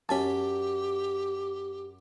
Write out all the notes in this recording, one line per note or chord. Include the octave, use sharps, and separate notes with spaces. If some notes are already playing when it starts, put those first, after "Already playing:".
F#2 C#4 G4 G#5 A5 B5